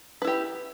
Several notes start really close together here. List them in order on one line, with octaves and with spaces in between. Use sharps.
B4 E4 G4